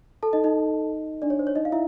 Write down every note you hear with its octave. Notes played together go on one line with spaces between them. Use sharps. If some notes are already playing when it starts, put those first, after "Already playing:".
A4 A5
D#4 D#5
D#4 D#5
D4 D5
C#5
C5
C#5
D#4 D#5
F5
E4 E5